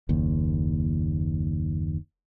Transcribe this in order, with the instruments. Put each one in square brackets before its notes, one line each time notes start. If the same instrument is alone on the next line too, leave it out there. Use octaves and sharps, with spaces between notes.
[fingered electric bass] F#1 D#2